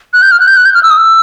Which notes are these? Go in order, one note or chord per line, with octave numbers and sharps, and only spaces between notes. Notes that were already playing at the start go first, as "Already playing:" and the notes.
F#6
G6
F6
F#6
G6
F#6
G6
F6
E6
D#6
E6